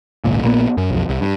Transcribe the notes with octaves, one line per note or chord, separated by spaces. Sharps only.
G#1 C#2 A#2
A#1 A#2 A#3 B3
F#2
B1 F2
C2
G2